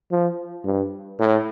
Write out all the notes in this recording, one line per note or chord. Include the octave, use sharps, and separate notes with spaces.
F3
G2
A2